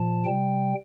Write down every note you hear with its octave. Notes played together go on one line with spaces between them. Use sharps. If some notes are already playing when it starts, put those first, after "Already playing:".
Already playing: A#2 F3 A5
C3 G3 G5